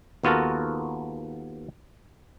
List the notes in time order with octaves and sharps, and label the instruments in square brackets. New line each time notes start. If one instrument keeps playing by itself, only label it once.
[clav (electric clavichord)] D#2 B3 F4 F#4 A4 A#4